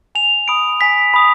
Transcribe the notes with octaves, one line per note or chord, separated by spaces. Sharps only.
G#5 F7
B5 D#6 D7
G#5 B6
B5 D#6